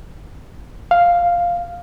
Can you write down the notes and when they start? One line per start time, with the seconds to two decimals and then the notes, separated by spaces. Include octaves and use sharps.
0.91 F5